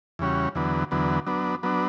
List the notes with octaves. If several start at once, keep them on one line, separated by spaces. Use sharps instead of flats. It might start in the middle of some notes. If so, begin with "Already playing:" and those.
E2 C#3 G3 C#4 F#4
E2 D3 F#3 B3
E2 D3 F#3 B3
F#3 B3 D4
F#3 B3 D4